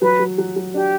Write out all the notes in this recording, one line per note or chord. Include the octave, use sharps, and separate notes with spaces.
F#3 B4
F#3
F#3
F#3
D4 G4